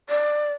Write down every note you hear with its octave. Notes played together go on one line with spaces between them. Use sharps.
D5